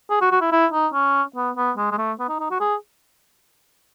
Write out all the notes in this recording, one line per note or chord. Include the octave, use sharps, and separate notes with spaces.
G#4
F#4
F#4
E4
E4
D#4
C#4
B3
B3
G#3
G#3
A3
B3
D#4
D#4
F#4
G#4